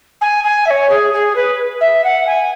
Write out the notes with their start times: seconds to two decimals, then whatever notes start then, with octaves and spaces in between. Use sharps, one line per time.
0.21 G#5
0.43 G#5
0.66 E5
0.70 C#5
0.89 G#4
1.13 G#4
1.35 B4
1.80 E5
2.04 F#5
2.26 G#5